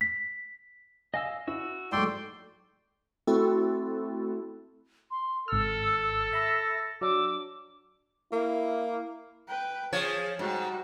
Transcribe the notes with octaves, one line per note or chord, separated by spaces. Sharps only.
B6
D#5 F5 G#5 E6
E4 F#4 E6
G#2 F#3 A3 D5 G5 C6 C#6 E6
A3 C4 E4 F#4 A4
C6
G#1 A4 E6 F6
E6
E5 B5 E6 A#6
F#3 D4 D6 E6
A#3 E4
B4 G5
F3 G#4 C#5
G#2 G3 F#4